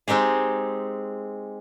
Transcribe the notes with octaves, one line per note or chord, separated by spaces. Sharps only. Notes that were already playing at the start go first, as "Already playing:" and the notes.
G#3 C4 D#4 G4 G#4